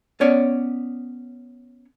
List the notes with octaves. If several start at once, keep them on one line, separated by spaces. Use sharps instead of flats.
B3 C#4 C#5 D5